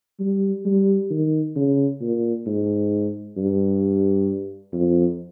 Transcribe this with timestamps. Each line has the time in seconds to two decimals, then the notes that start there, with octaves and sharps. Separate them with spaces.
0.20 G3
0.65 G3
1.10 D#3
1.56 C#3
2.01 A#2
2.47 G#2
3.37 G2
4.73 F2